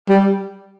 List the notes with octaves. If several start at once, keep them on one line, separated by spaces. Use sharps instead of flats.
G3